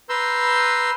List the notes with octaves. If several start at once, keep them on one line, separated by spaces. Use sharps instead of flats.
B4 A#5 C6 E6 G6